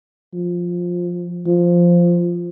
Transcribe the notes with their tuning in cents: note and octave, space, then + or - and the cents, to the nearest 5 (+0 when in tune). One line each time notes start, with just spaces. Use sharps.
F3 +10
F3 -5